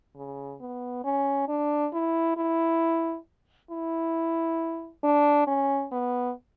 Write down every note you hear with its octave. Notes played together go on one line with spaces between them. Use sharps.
C#3
B3
C#4
D4
E4
E4
E4
D4
C#4
B3